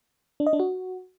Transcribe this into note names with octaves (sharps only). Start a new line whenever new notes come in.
D4
D#5
D4
F#4